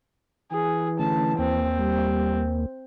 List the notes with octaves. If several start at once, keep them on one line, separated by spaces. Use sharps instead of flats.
E3 G#4
D3 A3 C#4 A5
D#2 A#3 C4
G3